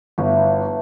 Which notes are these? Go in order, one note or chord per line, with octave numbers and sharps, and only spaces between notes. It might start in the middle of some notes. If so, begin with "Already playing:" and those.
G1 E3 F#3 A3